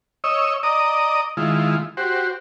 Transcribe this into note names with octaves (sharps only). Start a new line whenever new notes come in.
C#5 D#5 E6
D5 D#5 A#5 D#6
D#3 G#3 E4 F4
F#4 G4 C5